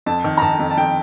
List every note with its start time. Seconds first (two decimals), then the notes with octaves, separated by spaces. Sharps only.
0.06 F2 A5
0.24 D#3
0.37 A#5
0.42 D#3 A5
0.59 F2
0.70 A5
0.77 F2 G5